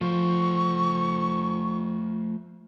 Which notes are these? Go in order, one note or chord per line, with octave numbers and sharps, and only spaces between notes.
F3 A3 C5 C#6